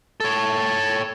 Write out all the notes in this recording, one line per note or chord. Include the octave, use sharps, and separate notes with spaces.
A4 C#5